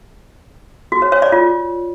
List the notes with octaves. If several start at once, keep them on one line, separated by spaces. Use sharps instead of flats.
F#4
C#5
C#5
D5
F4